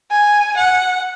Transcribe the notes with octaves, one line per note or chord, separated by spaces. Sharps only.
G#5
F#5